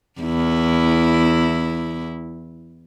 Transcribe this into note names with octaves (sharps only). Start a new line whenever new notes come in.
E2 E4